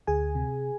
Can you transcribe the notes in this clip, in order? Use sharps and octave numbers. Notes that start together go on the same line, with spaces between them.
D2 G#4 G#5
C3